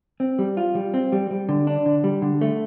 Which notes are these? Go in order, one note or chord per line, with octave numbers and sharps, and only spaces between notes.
C4
G3
F4
G3
C4
G3
G3
D3
D4
D3
G3
D3
A3